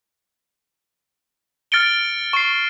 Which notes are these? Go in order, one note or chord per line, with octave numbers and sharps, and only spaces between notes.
F6 A6 C#7 D7 G7
C#6 C7